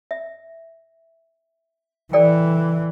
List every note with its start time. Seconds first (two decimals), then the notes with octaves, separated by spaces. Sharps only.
0.11 E5
2.13 E3 A4 D5 G5